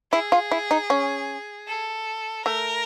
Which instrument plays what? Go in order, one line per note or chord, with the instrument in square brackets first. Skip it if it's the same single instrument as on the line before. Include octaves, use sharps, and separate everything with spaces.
[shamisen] E4 [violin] G#4
[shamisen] F4
E4
D#4
C#4
[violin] A4
[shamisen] A3 [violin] A#4